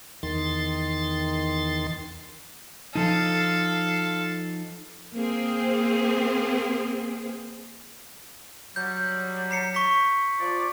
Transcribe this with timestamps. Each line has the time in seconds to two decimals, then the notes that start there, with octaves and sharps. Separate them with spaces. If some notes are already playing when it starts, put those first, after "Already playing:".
0.23 E2 D#3 C6 A6
2.95 F3 D#4 A4 F5
5.14 A#3 C4 G#4 C5
8.76 F#3 G3 G6
9.51 A#5 C7 C#7
9.75 C#6 B6
10.40 F3 F4 D5